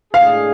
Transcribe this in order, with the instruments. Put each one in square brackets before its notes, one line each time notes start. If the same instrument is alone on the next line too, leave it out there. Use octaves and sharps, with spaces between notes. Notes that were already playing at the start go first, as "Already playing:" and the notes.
[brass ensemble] A2 G#3 D4 G#4 [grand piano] F5